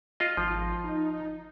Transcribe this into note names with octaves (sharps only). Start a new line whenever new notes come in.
F4 D#5
G#1 F3
D#4